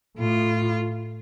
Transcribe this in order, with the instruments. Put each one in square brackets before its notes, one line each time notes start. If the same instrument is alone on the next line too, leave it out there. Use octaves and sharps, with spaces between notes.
[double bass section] A2 [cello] F4